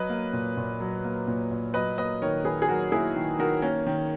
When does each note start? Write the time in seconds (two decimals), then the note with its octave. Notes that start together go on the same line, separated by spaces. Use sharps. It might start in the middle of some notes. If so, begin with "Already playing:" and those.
Already playing: F#3 B4 D#5
0.09 A#3
0.33 A#2
0.57 A#2
0.80 F#3
1.04 A#3
1.27 A#2
1.51 A#2
1.74 F#3 B4 D#5
1.98 A#3 B4 D#5
2.22 D#3 A#4 C#5
2.44 D#3 G#4 B4
2.62 G#4
2.68 F#3 F#4 A#4
2.92 A#3 E4 G#4
3.16 D#3
3.39 D#3 F#4 A#4
3.62 A#3 C#4
3.87 D#3